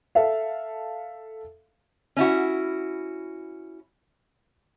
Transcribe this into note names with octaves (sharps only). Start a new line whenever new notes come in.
A4 E5 F5
C#4 E4 F#4